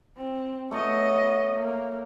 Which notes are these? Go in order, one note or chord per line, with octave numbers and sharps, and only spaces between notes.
C4
A3 B3 C#5 D#5
A#3